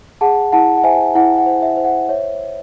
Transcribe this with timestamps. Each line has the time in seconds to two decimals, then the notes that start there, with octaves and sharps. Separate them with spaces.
0.21 G#4 F#5 A5
0.53 E4 F#5 A5
0.78 F#5
0.84 C5 E5 G#5
1.15 E4 F#5
1.38 F#5
1.46 C5
1.62 E5
1.77 C5
1.85 F#5
2.09 C#5 E5